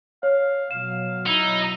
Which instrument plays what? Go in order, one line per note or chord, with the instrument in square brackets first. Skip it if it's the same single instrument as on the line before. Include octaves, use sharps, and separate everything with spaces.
[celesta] C#5 [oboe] F5
[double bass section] B2 F#3 [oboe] F5 [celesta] E7
[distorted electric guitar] D#4 [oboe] E4